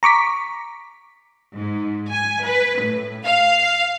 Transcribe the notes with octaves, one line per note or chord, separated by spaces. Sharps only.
A#5 C#6 D6 B6
G#2
G#5
B4
A2
F5